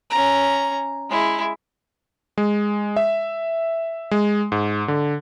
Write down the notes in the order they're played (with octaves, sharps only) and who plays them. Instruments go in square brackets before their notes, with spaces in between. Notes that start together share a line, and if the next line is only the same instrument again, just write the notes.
[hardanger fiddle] C#4 A#5
G#3 E4
[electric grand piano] G#3
E5
G#3
G#2
D3